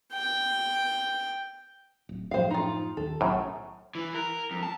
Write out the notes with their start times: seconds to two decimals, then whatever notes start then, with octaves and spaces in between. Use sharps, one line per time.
0.14 G5
2.09 D1
2.31 F#2 A2 F3 C5 F5
2.51 D#4 F4
2.97 D#2 A4
3.21 B1 F#2 A2
3.95 E3
4.15 A#4
4.51 F2
4.63 A5